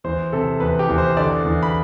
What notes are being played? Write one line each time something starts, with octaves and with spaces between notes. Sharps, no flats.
E2 C5
C3 A4
E2 B4
G4
E2
C5
D3 D5
E2
B5